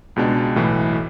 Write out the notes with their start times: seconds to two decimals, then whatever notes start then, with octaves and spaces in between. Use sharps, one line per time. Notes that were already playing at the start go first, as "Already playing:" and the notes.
0.16 C#2 B2 G#3 D4
0.56 B1 A2 E3